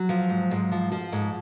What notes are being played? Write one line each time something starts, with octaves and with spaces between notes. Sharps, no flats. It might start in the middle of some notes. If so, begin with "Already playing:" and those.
Already playing: F#3
F3
G#2
G#2
F3
F3
G#2